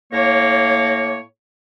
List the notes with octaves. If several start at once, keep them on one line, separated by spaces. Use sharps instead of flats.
A2 A#3 C#5